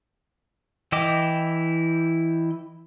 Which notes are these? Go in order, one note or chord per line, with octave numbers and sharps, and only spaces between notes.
E3 E4 D#5 G5 D6